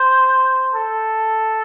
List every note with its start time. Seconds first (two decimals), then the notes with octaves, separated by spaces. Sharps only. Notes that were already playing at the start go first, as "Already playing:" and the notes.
Already playing: C5
0.74 A4